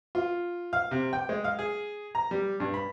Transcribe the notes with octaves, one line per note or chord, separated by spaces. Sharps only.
F4
F5
C3
G5
G#3
F5
G#4
A#5
G3
G2
B5